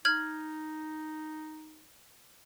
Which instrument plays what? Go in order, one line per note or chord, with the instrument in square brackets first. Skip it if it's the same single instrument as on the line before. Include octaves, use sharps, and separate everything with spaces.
[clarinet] D#4 [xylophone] F6 G#6 F#7